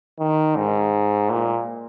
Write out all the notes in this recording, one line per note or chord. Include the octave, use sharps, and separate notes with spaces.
D#3
G#2
A#2